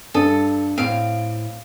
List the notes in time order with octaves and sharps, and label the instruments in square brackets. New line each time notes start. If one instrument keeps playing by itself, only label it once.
[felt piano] G2 [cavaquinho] A4 D#6
[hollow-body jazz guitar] A2 C4 [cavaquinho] F5 [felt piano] D7